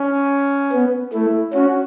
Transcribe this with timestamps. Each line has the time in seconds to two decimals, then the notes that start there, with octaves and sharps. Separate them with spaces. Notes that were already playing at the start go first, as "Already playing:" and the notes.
Already playing: C#4
0.73 B3
1.13 A3 E4
1.53 C#4 F#4